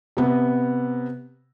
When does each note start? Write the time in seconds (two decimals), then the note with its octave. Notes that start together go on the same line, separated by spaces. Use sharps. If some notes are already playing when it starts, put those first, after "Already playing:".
0.17 C3 B3